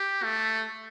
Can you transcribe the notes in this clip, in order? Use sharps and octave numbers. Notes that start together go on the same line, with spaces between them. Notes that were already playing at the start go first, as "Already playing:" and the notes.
Already playing: G4
A3